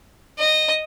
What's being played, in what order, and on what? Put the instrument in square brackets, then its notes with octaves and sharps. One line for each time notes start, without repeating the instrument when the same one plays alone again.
[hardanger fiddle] D#5